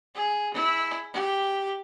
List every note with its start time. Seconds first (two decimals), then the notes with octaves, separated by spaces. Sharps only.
0.15 G#4
0.54 E4
1.14 G4